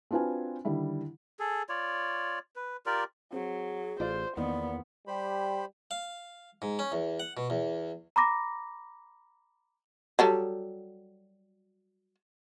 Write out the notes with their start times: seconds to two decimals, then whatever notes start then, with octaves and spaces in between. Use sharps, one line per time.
0.11 C4 D4 F4 F#4 B4 G#5
0.65 D3 D#3 G3 E4
1.39 G#4 A4
1.69 F4 C#5 D5
2.56 B4
2.86 F4 G4 A#4 D5
3.33 F#3 C4 G#4
4.00 A1 F4 C5 D5
4.37 E2 D#3 A#3 B3 D5
5.07 G3 G4 C5 B5
5.91 F5
6.62 G#2
6.79 C#4
6.92 E2
7.20 F#5
7.37 B2
7.50 E2
8.16 A#5 B5 D6 A#6
10.19 F#3 G3 A4